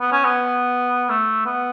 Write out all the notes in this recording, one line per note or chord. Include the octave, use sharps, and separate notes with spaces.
B3
C#4
B3
A3
B3